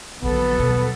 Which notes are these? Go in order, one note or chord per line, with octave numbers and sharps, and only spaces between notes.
A#1 D3 F#3 B3 A4
D#2 B2